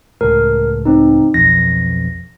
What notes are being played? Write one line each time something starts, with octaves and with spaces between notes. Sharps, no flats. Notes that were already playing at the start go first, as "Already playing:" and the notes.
C#2 A2 A#4
C4 D#4
B1 F2 A#6